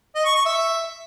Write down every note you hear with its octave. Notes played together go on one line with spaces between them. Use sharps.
D#5
C#6
C#6
E5